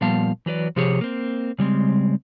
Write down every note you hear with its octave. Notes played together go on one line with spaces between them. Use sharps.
A#2 F3 G3 B3 F5 A5
E3 F#3 B4 D5
C3 F3 G4 G#4 C#5
A#3 C4
C#3 G3 G#3 C4